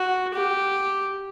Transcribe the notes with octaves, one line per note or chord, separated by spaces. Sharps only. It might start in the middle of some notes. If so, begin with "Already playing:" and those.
Already playing: F#4
G4